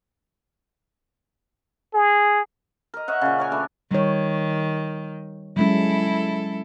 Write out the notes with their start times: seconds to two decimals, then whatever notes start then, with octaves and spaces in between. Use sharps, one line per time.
1.94 G#4
2.94 A#4 D#5
3.08 C#5 D#5 E5 F#5
3.21 A#2 C#3
3.38 A#4 C#5 G#5
3.52 A3 D4 B4 E5
3.91 D#3 G3 C#5
5.57 F#3 G#3 C#4 E4 A4